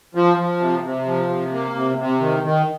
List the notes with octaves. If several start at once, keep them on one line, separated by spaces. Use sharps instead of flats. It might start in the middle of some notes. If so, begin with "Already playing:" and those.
F3
F3
C3
C3
F3
C3
A#3
C3
C3
D#3
D#3